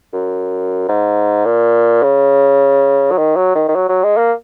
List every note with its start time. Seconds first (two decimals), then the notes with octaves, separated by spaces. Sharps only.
0.13 F#2
0.89 G#2
1.45 A#2
2.03 C#3
3.11 F#3
3.18 D#3
3.36 F#3
3.55 D#3
3.68 D#3
3.75 F#3
3.89 F#3
4.04 G#3
4.17 A#3